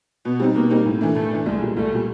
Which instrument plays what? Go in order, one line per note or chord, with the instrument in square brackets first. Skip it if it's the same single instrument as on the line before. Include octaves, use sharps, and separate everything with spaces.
[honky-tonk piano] B2 [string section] B3
[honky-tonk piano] G3 C4 D#4
[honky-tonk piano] B2 [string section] A#3
[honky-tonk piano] G3 C4 D#4
A2
E3 A3 D4
[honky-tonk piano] A2 [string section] A3
[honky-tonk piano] E3 A3 D4
[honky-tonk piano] C2 [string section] G#3
[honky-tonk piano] A#2 G3
[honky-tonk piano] C2 [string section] A3
[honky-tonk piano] A#2 G3